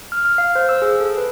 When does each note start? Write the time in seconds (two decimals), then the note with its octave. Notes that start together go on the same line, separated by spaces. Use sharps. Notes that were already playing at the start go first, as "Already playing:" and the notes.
0.12 F6
0.25 F6
0.38 F5
0.55 C5
0.69 E6
0.82 G#4
1.00 A4
1.17 B4